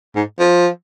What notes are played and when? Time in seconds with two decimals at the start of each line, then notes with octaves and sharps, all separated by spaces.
0.16 G#2
0.39 F3